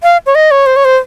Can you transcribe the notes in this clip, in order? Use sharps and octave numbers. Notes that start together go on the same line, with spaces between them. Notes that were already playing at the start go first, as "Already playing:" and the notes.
F5
C#5
D#5
C#5
C5
C#5
C5